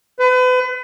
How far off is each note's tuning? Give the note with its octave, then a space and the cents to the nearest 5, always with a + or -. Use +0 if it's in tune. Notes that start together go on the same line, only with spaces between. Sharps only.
B4 +35